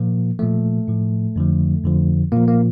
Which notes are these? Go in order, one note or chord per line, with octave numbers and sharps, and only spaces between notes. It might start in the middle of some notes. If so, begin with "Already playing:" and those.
Already playing: A#2 F3 A#3
A#2 F3 A3
A2 F3
F2 D3 F3
F2 D3 F3
A#2 F3 A#3
A#3